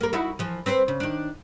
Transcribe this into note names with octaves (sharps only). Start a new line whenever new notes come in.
A#3 A#4
D#4 E4 F#4
E3 F3
C4 B4 C5
C#3
D#3 D4